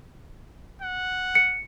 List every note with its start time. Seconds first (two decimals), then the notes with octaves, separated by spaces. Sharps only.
0.82 F#5
1.35 C#7